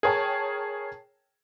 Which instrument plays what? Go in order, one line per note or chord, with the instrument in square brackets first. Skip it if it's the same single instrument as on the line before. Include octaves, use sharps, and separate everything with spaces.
[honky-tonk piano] G#4 A#4 C#5 G5 A5